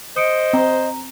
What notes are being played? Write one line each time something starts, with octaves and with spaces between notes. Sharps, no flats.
C5 D#5 D#6 C#7 D7
C4 A#5